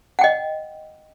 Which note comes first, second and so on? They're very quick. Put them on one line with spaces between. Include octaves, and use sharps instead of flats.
F#5 G5 D#5